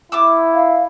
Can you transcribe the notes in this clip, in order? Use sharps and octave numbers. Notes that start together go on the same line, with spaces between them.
B3 E4 D6 E6
F5